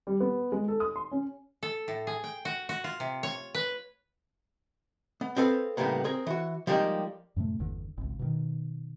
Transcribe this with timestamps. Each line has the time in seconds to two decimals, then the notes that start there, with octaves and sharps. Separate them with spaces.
0.07 G3
0.20 B3
0.52 G#3
0.68 A4
0.80 D#6
0.96 C6
1.12 C#4
1.63 A4
1.88 A2
2.07 G#4
2.24 G5
2.45 F#4
2.69 F#4
2.84 F4
3.00 C3
3.23 C#5
3.55 B4
5.21 B3
5.36 C4 G#4 A4 B4 F5
5.77 A2 C#3 G3 G#3 A#3 B3
6.04 C4 G#4 A#4
6.27 E3 F#4
6.67 F3 G3 G#3 A#3 D#4 G4
7.36 F#2 A2 C3 A3
7.59 G1 E2 D3
7.98 G#1 C#2
8.19 B2 D3 D#3